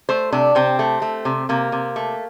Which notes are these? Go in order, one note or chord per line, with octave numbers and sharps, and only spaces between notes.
A3 C5
C3 D4
C3 C4
A3
A3
C3
C3 A#3
C3
A3